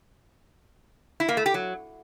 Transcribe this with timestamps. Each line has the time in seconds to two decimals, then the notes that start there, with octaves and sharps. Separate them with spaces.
1.20 E4
1.29 A#3
1.37 A3
1.46 G4
1.54 F#3